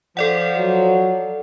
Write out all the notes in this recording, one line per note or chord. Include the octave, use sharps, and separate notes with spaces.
F3 A4 D5 F#5
F#3